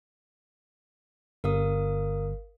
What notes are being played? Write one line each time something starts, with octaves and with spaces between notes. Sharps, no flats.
G1 A#4 F5 D#6